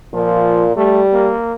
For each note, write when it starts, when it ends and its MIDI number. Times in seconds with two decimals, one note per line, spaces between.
0.14 0.75 46
0.14 0.65 53
0.76 1.30 55
0.76 1.00 57
1.13 1.53 58